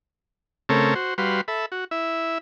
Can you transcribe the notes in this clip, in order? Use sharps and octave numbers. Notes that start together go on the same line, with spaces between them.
C#3 A3 C4 A4 A#4 C#5
F#4 C5
G3 F#4 B4 F5 C6
A4 E5 B5
F#4
E4 E5